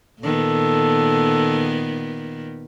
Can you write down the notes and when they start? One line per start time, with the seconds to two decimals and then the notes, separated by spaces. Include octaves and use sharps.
0.21 A#2 D#3 B3 A4